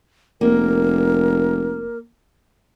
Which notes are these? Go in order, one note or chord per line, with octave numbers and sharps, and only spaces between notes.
F1 A#3 A#4